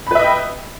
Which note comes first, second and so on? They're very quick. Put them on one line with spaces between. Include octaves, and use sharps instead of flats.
B5 B4 E5 D#5 G5